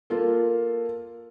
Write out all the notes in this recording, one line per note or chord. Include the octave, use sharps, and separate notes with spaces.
A#3 F4 A4